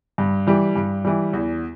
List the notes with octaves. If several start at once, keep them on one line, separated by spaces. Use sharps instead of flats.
G2
E3 G3
G2
E3 G3
E2